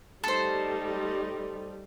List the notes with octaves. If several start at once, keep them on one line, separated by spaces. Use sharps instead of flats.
G3 A3 D#4 A4 C5